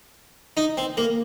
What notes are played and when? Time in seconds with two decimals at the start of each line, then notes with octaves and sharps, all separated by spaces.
0.57 D#4
0.77 C4
0.97 A#3